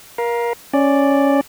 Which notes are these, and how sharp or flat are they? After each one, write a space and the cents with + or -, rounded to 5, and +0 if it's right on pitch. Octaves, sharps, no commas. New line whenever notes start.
A#4 +25 F5 +0
C#4 +0 D5 +0